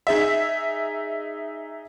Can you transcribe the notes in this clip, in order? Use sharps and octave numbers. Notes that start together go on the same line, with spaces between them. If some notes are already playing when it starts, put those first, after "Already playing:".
D#4 G#4 E5